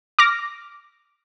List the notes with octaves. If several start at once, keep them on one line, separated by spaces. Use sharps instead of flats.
D6 F6 A#6